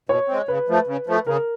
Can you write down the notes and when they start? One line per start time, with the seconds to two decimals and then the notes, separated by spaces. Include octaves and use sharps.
0.09 B2 C#5
0.28 G#3 C4
0.48 C#3 B4
0.68 F3 A3
0.87 C#3
1.07 F3 A3
1.27 C#3 A#4